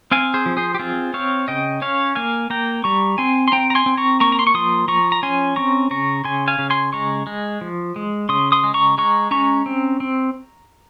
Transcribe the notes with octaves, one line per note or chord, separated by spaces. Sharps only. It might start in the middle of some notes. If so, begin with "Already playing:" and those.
C4 F5 G#5
G#4 C5
F3
G#4 C5
G4
C4 F4 G#4
C4 C#5 F5
C#3 D#5 G5
C#4 C#5 F5
A#3 F5 G#5
A#3 G5 A#5
G3 A#5 C#6
C4 G#5 C6
C6
C4 G5 A#5
A#5
G#5 C6
C4
A#5 C#6
A#3 A#5 C#6
A#5
C6
C#6
F3 C6 D#6
F3 A#5 C#6
A#5
C#4 G#5 C6
C4 A#5 C#6
C#3 A#5 C#6
C#3 G#5 C6
F5 G#5
C#3
G#5 C6
G#3 A#5 C#6
G#3
F3
G#3
C#3 C6 D#6
C6 D#6
G#3
A#5 C#6
G#3 A#5 C#6
C#4 A#5 C#6
C4
C4